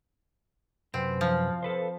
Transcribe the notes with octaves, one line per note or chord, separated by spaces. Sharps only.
F#2 C3 C4 B4
F3
A4 B4 C5